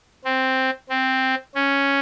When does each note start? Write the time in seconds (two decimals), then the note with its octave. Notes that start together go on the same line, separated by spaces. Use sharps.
0.25 C4
0.90 C4
1.55 C#4